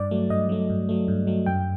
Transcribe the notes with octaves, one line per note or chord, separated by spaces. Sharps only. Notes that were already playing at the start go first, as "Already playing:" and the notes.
Already playing: G2 D5
F#3 A3
G2 D#5
F#3 A3
G2
F#3 A3
G2
F#3 A3
F#2 G5